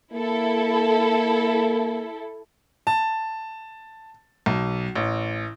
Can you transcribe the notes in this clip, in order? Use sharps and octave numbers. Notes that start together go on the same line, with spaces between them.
A#3 E4 A4
A5
B1
A1